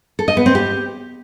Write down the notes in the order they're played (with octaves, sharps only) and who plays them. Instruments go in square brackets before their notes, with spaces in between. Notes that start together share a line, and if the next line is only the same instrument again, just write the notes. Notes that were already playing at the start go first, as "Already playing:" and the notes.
[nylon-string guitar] A4
D#5
B3
C4
G4